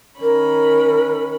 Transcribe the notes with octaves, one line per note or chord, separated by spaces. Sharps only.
D#3 C#4 A#4 B5